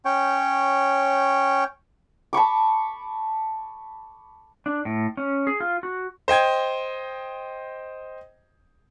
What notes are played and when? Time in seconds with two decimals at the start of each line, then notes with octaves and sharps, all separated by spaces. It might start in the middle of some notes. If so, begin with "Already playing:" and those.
0.05 C#4 C#5 G5
2.33 A5 B5 C#6 D6
4.66 D4
4.85 A2
5.17 C#4
5.47 G#4
5.60 F4
5.83 F#4
6.28 C5 D#5 G5 G#6